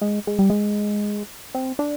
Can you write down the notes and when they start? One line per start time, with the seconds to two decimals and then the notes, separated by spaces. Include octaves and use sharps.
0.01 G#3
0.27 G#3
0.39 G3
0.50 G#3
1.55 C4
1.79 D4